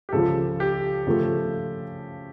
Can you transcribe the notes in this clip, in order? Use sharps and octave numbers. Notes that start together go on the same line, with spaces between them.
G4
C#2 C#3 F3 A4
G4
C#3 F3 A3